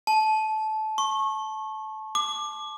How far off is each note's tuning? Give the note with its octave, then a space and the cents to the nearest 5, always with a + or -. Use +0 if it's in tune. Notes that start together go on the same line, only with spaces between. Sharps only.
A5 -20
C#6 -25
D6 +20